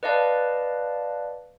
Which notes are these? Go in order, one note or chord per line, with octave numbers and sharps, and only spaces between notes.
B4 D5 D#5 F5 A5